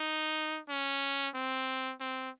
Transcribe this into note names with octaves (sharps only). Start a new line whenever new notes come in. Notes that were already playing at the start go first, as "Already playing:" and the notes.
Already playing: D#4
C#4
C4
C4